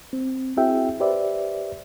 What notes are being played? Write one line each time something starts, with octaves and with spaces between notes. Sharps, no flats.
C4
C4 E4 F#4 G#4 E5 G5
G4 B4 C5 D5 E5